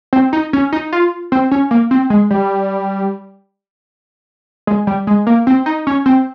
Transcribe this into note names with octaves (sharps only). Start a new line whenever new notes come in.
C4
D#4
C#4
D#4
F4
C4
C#4
A#3
C4
G#3
G3
G#3
G3
G#3
A#3
C4
D#4
C#4
C4